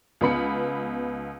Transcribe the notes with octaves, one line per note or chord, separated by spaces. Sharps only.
C#2 B3 B5 C#7